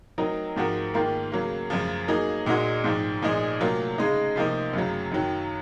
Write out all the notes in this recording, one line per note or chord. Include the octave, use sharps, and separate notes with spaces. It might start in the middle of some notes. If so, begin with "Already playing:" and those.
F#3 C4 D#4 A#4
G#2 F3 C4 F#4 A#4
G#2 D#3 A#3 F4 A#4
C#3 F#3 A#3
F#2 C#3 F3
F#3 A#3 D#4 G#4
A#2 G#3 D#4 F#4
G#2 F3 C4
A#2 F3 G#3 D#4 G#4
C3 F#3 A#3 F4
C#3 G#3 D#4
C3 F3 A#3 D#4
F#2 C#3 F#3
F#2 D#3 F#3